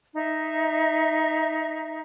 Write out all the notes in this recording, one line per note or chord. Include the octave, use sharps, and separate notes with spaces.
D#4 E5